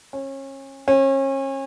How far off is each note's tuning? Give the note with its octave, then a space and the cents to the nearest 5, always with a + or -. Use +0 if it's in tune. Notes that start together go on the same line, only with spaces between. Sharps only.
C#4 -30
C#4 -35